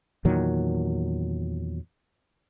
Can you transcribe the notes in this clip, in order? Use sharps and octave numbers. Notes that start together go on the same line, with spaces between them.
E2 A#2 D#3 F#3